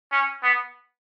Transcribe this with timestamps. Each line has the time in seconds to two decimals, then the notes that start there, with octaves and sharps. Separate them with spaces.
0.12 C#4
0.43 B3